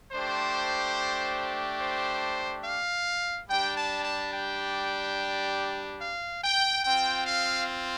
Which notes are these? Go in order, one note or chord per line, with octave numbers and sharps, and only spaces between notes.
A3 D4 G4 C5
C5
F5
G3 D4 G4 G5
A5
A5
G5
F5
G5
C4 F4 G5
F5